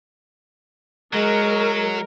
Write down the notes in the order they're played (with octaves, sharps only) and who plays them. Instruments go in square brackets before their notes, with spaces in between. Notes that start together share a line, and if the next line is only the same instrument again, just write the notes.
[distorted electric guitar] F#3 [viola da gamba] G#3 [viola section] A#4